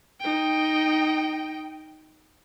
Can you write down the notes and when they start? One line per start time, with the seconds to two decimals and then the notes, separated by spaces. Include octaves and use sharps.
0.20 D#4 G5